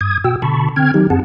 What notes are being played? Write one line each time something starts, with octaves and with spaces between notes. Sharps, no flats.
G2 D#6 G#6
B2 F#4 G5 E6
B2 D3 A5 B5 C#6
D3 C4 G5 F6 G#6
D#3 F#3 D#4 G4
F#2 C4 G#4 F#5 A5